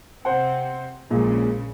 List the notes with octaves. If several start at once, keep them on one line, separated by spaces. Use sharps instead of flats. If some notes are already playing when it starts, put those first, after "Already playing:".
C3 C4 C5 F#5
A#1 A#2 C#3 G#3